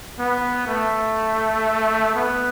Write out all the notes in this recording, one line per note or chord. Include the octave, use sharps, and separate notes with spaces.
B3
A3
B3